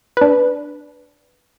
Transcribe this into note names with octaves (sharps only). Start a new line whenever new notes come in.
D4 B4